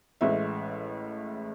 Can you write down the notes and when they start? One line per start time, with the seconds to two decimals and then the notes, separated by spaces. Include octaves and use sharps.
0.21 A1 A2 G#3 E5